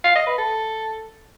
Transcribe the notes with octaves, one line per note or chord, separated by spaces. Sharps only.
F5
D#5
B4
A4